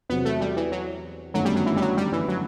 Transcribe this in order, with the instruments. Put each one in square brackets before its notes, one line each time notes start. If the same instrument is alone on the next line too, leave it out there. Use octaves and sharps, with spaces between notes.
[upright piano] E2 C3 F#3 C4 [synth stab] B3
[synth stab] A3
G3
E3
F#3
[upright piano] G1 F#2 D#3 A3 [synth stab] F#3
[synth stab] G3
F#3
E3
G3
F#3
G3
E3
F#3